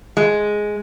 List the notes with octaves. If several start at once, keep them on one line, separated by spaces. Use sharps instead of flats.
G#3